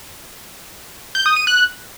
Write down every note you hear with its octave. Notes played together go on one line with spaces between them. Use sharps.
G6
D#6
D#7
F#6